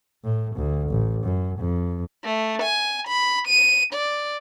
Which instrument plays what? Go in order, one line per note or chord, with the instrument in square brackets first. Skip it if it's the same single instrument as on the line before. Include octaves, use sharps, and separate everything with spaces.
[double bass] A2
D2
A1
F#2
F2
[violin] A3
G#5
B5
D#7
D5